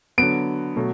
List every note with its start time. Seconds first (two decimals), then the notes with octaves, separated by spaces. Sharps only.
0.18 D3 F#3 B3 D7
0.76 B2 F#3 A3